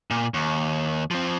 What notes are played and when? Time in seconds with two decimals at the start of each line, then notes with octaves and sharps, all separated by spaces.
0.11 A#2
0.34 D#2
1.11 F3 C4